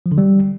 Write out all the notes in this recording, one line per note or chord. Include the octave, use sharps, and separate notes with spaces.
F3
D3
G3